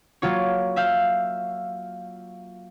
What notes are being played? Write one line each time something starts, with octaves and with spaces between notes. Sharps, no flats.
F#3 A#3 F4 C#5
E5 F5 G6